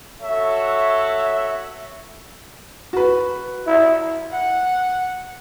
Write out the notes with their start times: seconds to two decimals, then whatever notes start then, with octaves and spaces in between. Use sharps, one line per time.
0.22 F#4 A4 C#5 E5
2.93 F#4 B4
3.66 E4
4.32 F#5